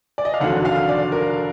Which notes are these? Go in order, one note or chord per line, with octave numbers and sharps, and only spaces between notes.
D5
D#5
F5
F1 D#2 D3 F#3 F#5
F5
D5
A#4